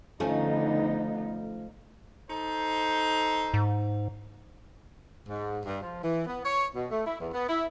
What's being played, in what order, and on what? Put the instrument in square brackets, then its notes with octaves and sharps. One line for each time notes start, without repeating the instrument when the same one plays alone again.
[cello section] D3 B3 D#4 [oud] F3 A3 C#4
[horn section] D#4 A4 C5
[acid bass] G#2
[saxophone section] G#2
G2
F3
E3
B3
C#5
B2
A3
E4
E2
B3
E4